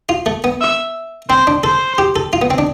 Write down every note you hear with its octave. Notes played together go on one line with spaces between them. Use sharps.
F4
A3
B3
E5
C4 C5
D4
A4 C5
G4
A4
F4
B3
C4
D4